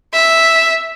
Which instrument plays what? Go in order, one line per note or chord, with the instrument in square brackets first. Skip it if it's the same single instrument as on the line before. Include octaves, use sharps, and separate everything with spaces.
[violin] E5